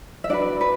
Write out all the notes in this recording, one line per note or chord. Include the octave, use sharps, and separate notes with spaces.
E5
D4 F#4 B4 D5
B4